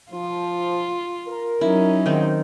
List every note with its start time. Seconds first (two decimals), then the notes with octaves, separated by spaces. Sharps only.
0.12 F3 F4
1.27 A#4
1.61 F#3 C#4 D#4 E4
2.06 D#2 G#2 D#3 C4